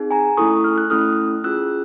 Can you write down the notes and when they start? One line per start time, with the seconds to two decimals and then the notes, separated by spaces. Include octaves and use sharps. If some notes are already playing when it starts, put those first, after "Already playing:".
Already playing: C4 D#4 G#4
0.11 G#5 A#5
0.37 A3 C#4 E4 A4 C#6 D#6
0.64 F6
0.78 F#6
0.90 A3 C#4 E4 A4 D#6 F6
1.44 C#4 F4 G#4 E6 F#6